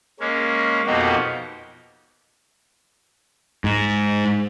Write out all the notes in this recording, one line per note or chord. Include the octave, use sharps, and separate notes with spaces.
G#3 A#3 C#4
F2 B2 A#3 D#4 F#4 G4
G#2